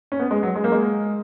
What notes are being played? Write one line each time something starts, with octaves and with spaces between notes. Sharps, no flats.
C#4
B3
G#3
F#3
G#3
A#3
G#3